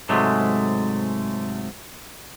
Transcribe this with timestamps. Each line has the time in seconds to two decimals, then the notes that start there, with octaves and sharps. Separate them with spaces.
0.09 G#2 C3 F#3 G#3 A3